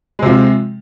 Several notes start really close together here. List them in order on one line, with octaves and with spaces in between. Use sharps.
G#3 C3 F3